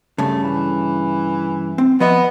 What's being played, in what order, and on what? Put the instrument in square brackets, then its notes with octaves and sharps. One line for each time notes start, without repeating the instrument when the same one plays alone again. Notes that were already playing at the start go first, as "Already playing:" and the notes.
[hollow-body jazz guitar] G2 C#3 [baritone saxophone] A3
[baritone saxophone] E3
[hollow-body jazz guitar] C4
[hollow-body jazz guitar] F3 D#5 E5 [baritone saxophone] B3